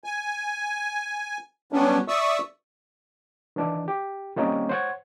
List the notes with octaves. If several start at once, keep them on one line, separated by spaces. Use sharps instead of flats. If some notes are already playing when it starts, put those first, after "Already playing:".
G#5
F#3 G3 B3 C#4 D4
D5 E5 C#6 D#6 E6
D#3 E3 D4
G4
D#3 G3 A#3 C4 C#4 D#4
C5 C#5 F#5 G#6